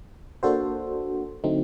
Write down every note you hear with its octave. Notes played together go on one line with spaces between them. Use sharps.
A#3 D4 F#4 A4 C5
D3 F#3 A3 C4 D#4